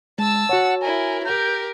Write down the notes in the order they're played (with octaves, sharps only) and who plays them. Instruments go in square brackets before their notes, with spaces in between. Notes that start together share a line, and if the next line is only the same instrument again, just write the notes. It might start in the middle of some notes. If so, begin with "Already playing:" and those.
[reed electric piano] G#3 [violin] A5 E6
[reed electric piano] F#4 C#5 [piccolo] F#5
[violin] E4 A#4 [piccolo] G#5
[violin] G4 A#4 [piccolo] G6